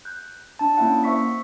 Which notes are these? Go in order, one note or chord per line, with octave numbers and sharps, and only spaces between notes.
F#6 G6
D4 A5
A#3 C#4 D4 E4 E5 F#5
C5 E5 C#6 B6